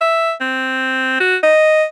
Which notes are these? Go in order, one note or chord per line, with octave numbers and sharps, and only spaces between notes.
E5
C4
F#4
D#5